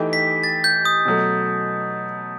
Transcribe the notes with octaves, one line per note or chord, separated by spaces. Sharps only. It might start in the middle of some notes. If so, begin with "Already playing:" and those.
Already playing: E3 A3 D#4 G4
B6
A6
G6
D#6
B2 F#3 A3